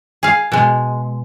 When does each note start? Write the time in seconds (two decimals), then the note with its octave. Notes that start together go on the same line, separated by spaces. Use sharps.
0.23 G#4 F5
0.52 B2 G#3